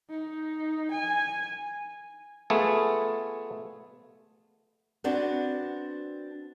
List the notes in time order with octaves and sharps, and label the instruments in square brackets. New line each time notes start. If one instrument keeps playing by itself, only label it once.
[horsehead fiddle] D#4
G#5
[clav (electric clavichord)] A3 B3 F4 G#4 A4
[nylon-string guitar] B3 C4 D4 F#4